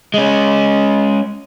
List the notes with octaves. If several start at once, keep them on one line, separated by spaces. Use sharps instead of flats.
G#3 C#4